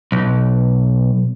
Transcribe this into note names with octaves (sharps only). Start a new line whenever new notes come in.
B1